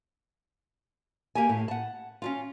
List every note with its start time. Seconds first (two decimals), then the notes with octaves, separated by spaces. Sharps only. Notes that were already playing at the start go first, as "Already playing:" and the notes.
1.35 A#3 G4 G#5
1.49 A2
1.68 F#5 A5
2.22 C#4 D4 F4